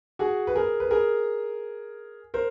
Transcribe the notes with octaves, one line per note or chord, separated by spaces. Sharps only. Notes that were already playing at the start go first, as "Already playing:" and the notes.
F#4 G#4
B4
G#4 A#4
B4
G#4 A#4
A#4 C5